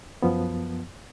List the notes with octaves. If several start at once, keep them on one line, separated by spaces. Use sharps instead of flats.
F#2 F3 B3